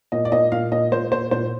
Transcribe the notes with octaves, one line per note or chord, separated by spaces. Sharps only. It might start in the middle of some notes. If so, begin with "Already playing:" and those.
A#2 D#5
D5
A#2 D#5
A#2 F5
A#2 D#5
A#2 C5
A#2 C5
A#2 C5